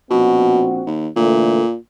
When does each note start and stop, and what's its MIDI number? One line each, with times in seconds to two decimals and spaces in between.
0.10 0.83 34
0.10 0.68 47
0.10 0.83 60
0.10 0.83 66
0.87 1.08 39
1.16 1.75 46
1.16 1.61 50
1.16 1.61 52
1.16 1.61 57